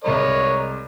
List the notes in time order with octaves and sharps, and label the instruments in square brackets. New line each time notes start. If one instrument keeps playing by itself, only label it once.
[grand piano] C2 G#3 B5 [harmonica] A#4 C#5 D#5